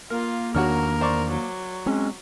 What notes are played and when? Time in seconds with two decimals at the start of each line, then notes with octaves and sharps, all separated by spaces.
0.10 A#3 F4 A#4
0.55 E2 D#3 D4 F#4 A#4 C#5 F6
1.01 C5 D5 C#6
1.31 F#3
1.86 G#3 C4 C#4